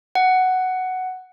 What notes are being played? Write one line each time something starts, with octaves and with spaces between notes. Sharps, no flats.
F#5